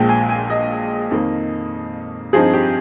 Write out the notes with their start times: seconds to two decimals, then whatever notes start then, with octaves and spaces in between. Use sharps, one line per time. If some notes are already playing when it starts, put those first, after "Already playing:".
Already playing: A#1 A#2 F3 G#3 G5
0.09 G#5
0.29 G#5
0.50 D#5
1.11 F2 D#3 A#3
2.33 G2 F3 C4 D#4 G#4
2.53 G4